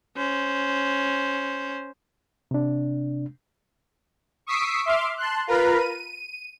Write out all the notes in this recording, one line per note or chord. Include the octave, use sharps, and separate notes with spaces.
C#4 C5
C3 D4
C#6 D#6 E6 B6 C7 D7
E5 C6 D6 F6
A5 C6 F#6
F4 A#4 B4 A#5 B5
D#7
D#7